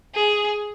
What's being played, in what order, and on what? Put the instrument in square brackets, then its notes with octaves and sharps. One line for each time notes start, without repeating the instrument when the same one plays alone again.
[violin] G#4